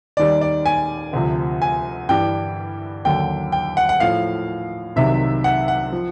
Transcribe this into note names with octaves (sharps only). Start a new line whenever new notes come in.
D#2 D#3 G3 D5
D5
G#5
D2 C3 F3
G#5
G2 E3 G3 G5
D#2 D3 F#3 G5
G5
F#5
F#5
A2 F3 F5
C2 C3 D#3 F#3 E5
F#5
F#5
F3